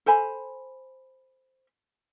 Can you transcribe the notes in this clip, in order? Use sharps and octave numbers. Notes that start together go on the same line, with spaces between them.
A4 C5 G#5 B5